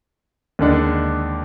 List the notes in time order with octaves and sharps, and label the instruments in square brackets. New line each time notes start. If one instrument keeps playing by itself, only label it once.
[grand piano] D#2 D3 G#3 D4